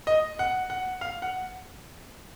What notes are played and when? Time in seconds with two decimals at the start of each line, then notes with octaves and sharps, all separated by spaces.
0.07 D#5
0.39 F#5
0.70 F#5
1.01 F5
1.22 F#5